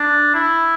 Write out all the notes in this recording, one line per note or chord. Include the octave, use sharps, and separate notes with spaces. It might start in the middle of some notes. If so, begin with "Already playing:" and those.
Already playing: D4
E4